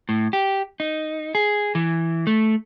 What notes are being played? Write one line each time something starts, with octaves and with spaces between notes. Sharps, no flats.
A2
G4
D#4
G#4
E3
A3